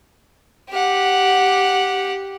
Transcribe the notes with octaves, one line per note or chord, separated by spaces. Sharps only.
G4 F#5